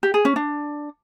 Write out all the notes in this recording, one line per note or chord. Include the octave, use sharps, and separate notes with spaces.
G4
G#4
C#4
D4